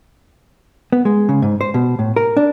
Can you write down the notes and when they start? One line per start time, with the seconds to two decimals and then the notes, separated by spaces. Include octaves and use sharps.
0.92 B3
1.05 G#3
1.29 C#3
1.42 G#2
1.61 C5
1.74 B2
1.99 A2
2.16 A#4
2.37 D4